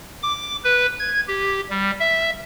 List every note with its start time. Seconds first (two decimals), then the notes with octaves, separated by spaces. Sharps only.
0.23 D6
0.64 B4
0.99 G#6
1.28 G4
1.70 G3
2.00 E5